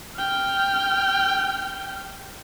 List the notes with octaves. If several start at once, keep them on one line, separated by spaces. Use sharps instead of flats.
G5 F6